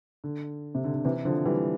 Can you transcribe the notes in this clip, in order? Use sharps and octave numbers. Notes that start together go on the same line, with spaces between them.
D3
C3
D3
D3
C3 E3
D3 F3
E3 G3